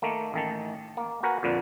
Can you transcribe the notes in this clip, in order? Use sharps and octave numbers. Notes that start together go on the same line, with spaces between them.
D#3 A3 A#3
A1 D#3 A5
A#3
F#4 A#4 B4 F#5 G#5
F2 A#2 D3 B4